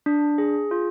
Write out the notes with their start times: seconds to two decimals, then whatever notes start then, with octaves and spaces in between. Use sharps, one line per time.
0.06 D4
0.38 G#4
0.71 F4